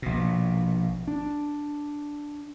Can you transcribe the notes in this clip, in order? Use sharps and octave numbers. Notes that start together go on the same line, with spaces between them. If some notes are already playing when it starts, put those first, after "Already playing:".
A#1 B2
D4